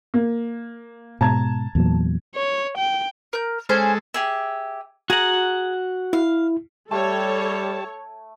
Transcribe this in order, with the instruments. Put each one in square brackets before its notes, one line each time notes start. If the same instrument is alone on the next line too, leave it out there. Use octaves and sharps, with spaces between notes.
[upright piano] A#3
[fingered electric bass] G#2 B2 [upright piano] A5 A#5 G#6
[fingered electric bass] E2 A#2 F#3
[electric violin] C#5
G5
[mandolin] A#4 G6
[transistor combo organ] G#3 A4 [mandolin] C#4 G#4 C5
[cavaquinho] G4 G#4 E5
[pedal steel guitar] F#4 F#5 [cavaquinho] G#4 A#5
[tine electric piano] E4 [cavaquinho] F5
[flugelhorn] G3 [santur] A3 [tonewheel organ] G4 A5 [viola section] A4 C#5